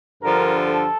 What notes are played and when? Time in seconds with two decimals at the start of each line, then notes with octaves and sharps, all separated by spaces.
0.22 G2 D3 F3 A#4
0.68 A4